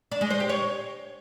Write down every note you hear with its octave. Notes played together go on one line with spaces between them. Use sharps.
D4
G#3
C5
G4
C#5